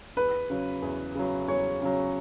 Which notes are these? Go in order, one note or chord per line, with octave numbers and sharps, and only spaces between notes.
E2 B4
C#3 F#3
E2
C#3 F#3
E2 C#5
C#3 F#3